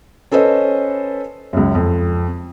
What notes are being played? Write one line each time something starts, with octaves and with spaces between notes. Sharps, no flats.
C#4 A4 B4 C5 D#5
C#2 F#2
F2